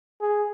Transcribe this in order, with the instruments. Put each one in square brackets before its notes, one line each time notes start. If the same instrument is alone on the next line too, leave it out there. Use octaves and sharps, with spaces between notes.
[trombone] G#4